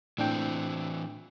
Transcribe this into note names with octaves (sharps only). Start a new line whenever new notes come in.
A2 E3 C4 D4 G5